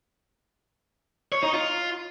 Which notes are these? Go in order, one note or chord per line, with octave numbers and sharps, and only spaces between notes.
C#5
D#4
F4